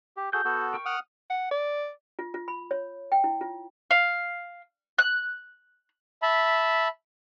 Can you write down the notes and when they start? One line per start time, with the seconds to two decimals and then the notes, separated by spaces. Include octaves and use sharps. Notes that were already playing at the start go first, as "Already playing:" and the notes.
0.17 G4
0.33 F#4 G#4 A4 G6
0.45 B3 F#4 A4
0.74 A#4 G5 C#6
0.86 F#5 D#6 F6
1.30 F#5
1.51 D5
2.19 F4
2.34 F4
2.48 B5
2.71 C#5
3.12 G5
3.24 E4
3.41 F4
3.91 F5
4.99 F#6
6.22 E5 A5 B5